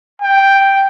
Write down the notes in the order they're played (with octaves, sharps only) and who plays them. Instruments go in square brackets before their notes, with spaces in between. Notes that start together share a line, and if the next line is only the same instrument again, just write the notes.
[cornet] G5